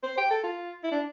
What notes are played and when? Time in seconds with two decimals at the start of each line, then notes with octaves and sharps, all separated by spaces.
0.03 C5
0.17 G5
0.31 A4
0.44 F4
0.84 E4
0.92 D4